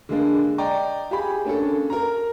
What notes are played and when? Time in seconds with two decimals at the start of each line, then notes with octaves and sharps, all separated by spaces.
0.09 D3 G#3 A#3 D4
0.58 D5 D#5 G5 A#5
1.10 F4 G4 G#4 B5
1.45 A#3 C#4 D4 A4
1.90 A#4 A#5